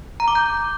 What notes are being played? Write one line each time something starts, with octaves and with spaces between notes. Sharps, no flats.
A#5
D6
G6